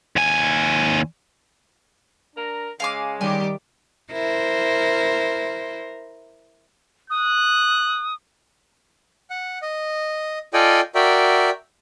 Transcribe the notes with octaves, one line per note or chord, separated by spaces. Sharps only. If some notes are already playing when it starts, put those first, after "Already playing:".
D#2 G#5
D4 A#4 A#5
C#3 G#3 F5 G#5 D6
D#3 G3 G4 G#5
E4 A#4 C5
D#6 F#6
F#5
D#5
F4 A4 D5 D#5 G5 G#5
F#4 A#4 D5 E5 G5